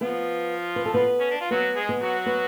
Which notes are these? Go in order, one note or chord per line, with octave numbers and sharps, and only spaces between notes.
F3 B3 F4 B4
B4
A4
B3 B4
C#4
D4
F4
F#3 B3 F#4 B4
G#3 G#4
B3 B4
F#3 F#4
B3 B4